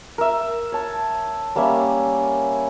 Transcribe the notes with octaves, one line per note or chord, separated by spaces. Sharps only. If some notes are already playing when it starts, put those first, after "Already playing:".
A#4 E5
C#5 A5
G3 A#3 C#4 E5